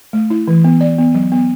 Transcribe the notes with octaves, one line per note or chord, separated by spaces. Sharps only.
A3
E4
E3
B3
D5
B3
F#3
B3